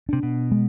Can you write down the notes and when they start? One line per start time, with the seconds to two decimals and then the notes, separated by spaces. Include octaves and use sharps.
0.09 C3 D4
0.23 B2
0.51 G#3